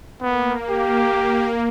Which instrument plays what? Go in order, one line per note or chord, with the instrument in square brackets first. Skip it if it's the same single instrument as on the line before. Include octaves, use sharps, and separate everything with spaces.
[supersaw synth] A#3 [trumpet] B3
[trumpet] G4